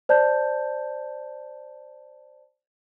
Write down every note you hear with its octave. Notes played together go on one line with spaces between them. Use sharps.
C5 D5 A5 G6